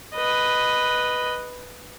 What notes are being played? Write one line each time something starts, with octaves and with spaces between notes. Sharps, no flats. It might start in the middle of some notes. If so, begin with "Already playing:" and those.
B4 D#5